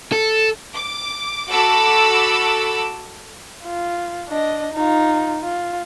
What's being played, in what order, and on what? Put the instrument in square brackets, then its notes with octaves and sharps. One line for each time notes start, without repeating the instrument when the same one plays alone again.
[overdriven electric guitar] A4
[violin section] D6
F#4 A4 A5 B5 D6 E6
[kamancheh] F4
D4 D#5
D#4 F4
F4